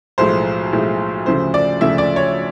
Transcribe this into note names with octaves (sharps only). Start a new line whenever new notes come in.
B1 A2 F3 G#3 C5
B1 A2 F3 G#3
D2 C#3 F3 A3 C5
D5
D2 C#3 F3 A3 E5
D5
C#5